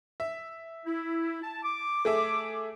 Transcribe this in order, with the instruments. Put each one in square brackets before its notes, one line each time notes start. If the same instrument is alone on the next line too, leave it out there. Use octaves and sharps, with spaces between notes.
[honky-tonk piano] E5
[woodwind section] E4
A5
D6
[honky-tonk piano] A3 G#4 E5